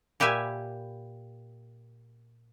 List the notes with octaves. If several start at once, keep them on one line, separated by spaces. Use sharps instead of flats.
A#2 G4 B4 E5 G#5